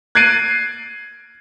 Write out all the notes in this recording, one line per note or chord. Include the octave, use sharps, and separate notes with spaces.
F#6 G#6 A6 C7 D7 D#7